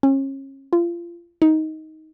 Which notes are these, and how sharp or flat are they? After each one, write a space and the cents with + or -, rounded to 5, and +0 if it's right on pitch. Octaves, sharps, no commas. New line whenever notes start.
C#4 -35
F4 -30
D#4 +15